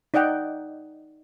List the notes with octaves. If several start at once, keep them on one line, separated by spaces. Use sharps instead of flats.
D#4 D5 D#5 F#5 G5